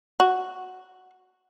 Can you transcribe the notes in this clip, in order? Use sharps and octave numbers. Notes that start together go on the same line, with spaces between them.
F#4